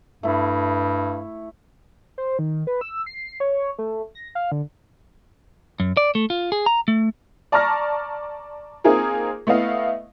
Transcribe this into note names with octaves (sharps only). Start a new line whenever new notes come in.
G2 A3 E4
C5
D#3
B4
E6
C7
C#5
A3
A#6
F5
D3
F#2
D5
A3
F4
G#4
A#5
A3
D5 A5 A#5 C#6 F6 A#6
A#3 C4 D#4 F4 G#4 A#4
A3 B3 E4 D#5 F5